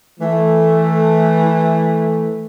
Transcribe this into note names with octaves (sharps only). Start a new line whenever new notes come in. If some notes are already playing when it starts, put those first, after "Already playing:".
E3 A3